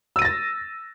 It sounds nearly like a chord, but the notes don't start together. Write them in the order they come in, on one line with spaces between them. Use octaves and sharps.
E6 D#7 A#6 A6